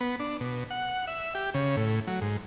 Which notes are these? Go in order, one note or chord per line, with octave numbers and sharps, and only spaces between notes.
B3
D4
B2
F#5
E5
G4
C#3
A2
F#3
G#2